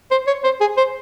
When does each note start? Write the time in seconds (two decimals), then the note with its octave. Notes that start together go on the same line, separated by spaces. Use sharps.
0.11 C5
0.27 C#5
0.44 C5
0.60 G#4
0.77 C5